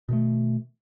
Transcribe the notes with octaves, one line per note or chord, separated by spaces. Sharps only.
B2 D#3 A3